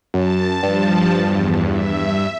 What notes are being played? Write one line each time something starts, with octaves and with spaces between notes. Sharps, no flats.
F#2 A5
G2 F3 A5
E2
E5